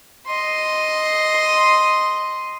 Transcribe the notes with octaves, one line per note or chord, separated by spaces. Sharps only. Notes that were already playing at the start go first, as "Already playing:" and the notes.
D#5 C6